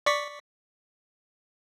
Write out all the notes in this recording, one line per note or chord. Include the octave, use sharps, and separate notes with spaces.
D5 C#6 B6